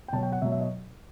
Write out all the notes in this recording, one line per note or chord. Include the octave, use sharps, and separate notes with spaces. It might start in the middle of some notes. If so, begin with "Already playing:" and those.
G5
B2 F#3 A5
G5
F#5
B2 F#3 E5
E5
D#5